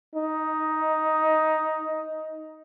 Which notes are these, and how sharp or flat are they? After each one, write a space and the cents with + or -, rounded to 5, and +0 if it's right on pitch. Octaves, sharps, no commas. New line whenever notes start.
D#4 +10